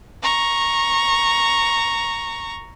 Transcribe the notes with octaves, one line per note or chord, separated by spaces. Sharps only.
A#5 C#6